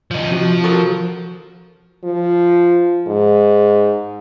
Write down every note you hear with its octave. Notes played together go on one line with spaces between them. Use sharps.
F3 D#4
C3 F3 F#4
F#4 A4 A#4
F3
G#2